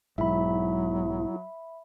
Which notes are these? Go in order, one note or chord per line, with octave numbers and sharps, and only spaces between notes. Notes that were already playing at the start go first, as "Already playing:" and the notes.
B1 G#2 F#3 E4 E5 B5